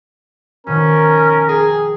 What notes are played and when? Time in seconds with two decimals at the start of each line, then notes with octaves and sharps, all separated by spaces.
0.67 F2 B2 D#3 C#4 A#4
1.49 G#4 G5